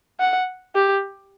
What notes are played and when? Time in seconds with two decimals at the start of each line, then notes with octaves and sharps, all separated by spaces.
0.20 F#5
0.75 G4